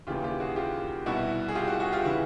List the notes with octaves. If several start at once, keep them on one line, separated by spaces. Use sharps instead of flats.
D#2 C#3 E3 F4 G4
F4 G4
F#4 G#4
F4 G4
C2 B2 E4 F#4
G#4
F4 G4
F#4 G#4
F#4 G#4
F4 G4
C#3 E3 E4 F#4